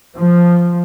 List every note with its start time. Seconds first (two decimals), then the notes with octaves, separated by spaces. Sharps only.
0.14 F3